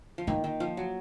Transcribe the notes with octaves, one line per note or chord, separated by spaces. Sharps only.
F3
D#3 A#3
D#3
F3
F#3